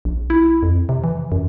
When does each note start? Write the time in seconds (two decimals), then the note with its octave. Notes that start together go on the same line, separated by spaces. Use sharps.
0.05 A#1
0.30 E4
0.63 F2
0.89 C3
1.04 E3
1.32 F#2